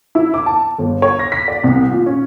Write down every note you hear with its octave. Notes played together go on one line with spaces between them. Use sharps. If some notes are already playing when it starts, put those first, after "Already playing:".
E4
D6
A5
G1
C#5
A#6
B6
D5
C2
A#2
C#4